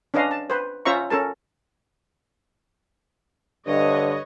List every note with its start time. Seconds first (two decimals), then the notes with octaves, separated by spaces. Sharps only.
0.14 C#4 D4 B4 D#5 F5
0.31 A5
0.50 B4 C5
0.85 C#4 F4 C5 E5 A#5 C#6
1.10 C#4 A4 A#4 A5
3.67 G2 D3 B4 C#5 D#5